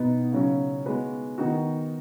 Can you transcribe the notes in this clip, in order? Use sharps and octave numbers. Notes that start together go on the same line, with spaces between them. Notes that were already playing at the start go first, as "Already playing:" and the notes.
Already playing: B2 B3 D#4
C#3 F#3 C#4
G#3 B3 F#4 B4
D#3 B3 D#4 F#4